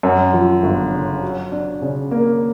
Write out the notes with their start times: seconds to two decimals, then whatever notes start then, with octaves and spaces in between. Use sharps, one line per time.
0.03 F#2
0.33 F3
0.63 G1
0.92 C#3
1.22 F#3
1.52 D4
1.82 C#3
2.11 A#3